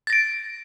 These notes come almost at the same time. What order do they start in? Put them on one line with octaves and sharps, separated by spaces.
A6 A#6 D7